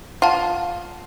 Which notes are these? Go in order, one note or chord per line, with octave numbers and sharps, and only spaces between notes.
F4 F#5 A5